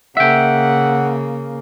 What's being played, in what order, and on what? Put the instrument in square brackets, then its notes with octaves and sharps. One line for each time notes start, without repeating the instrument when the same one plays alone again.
[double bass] C#3 A#3 [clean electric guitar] E5 G5 [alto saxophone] F#5